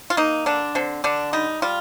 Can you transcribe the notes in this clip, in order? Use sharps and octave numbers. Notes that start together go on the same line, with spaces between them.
F4
A#3 D#4
D3 D4
D3 C4
D3 D4
G3 D#4
G3 F4